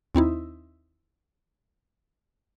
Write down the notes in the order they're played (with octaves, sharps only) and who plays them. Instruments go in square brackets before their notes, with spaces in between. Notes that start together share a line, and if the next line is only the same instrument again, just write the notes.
[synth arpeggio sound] D#2 C4 D#4 E4